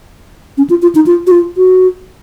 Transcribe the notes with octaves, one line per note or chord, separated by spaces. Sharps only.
C#4
F4
F4
D#4
F4
F#4
F4
F#4